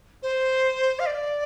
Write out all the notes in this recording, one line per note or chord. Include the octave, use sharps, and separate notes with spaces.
C5
F5
D5